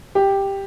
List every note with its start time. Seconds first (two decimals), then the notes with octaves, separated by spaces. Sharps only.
0.15 G4